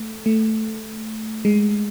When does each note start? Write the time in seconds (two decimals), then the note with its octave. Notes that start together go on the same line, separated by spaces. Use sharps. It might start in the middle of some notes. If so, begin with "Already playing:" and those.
Already playing: A3
0.26 A3
1.45 G#3